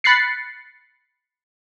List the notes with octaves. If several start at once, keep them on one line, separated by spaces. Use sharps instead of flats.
B5 F#6 A6 C7 C#7